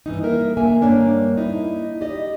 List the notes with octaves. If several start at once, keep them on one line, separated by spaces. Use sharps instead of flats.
G2 E3 D#4
A#3 A#4 E5
D3 A#3 E5 G#5
G2 A#3 D4 C#5
D#4 E4
G4 D5 D#5